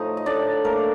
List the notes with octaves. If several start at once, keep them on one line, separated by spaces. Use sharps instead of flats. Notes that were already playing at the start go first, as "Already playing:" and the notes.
Already playing: A2 F3 A3 D#4
D#5
A2 D4 D5
A3 A#3 A#4